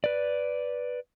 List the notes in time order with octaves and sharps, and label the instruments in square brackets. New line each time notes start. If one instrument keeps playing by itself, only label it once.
[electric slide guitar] B4 D5